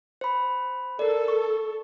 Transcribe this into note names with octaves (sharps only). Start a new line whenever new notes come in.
C5 B5
A4 A#4 D5
C#6